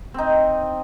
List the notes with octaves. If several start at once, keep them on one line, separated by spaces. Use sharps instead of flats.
C4 D#4